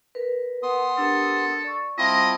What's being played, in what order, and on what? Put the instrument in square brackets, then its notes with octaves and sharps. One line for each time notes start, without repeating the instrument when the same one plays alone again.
[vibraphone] A#4 B4
[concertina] B3 C6 D#6
[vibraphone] D4 G4 A#4 [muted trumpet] A4
[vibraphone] D5 C#6
[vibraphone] G3 A5 [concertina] C4 E4 F4 [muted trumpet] D#5